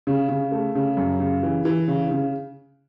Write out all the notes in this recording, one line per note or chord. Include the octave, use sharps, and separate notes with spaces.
C#3
C#3
A3
C#3
F#2
C#3
E3
E3
C#3
C#3